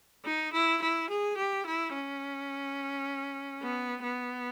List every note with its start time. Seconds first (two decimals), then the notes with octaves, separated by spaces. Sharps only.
0.24 D#4
0.53 E4
0.81 E4
1.09 G#4
1.37 G4
1.66 E4
1.93 C#4
3.62 B3
4.03 B3